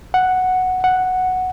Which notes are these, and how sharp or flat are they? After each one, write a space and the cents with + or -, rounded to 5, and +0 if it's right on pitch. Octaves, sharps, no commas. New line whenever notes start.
F#5 +0
F#5 +0